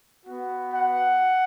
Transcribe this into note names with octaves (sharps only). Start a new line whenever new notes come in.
B3 F#4
F#5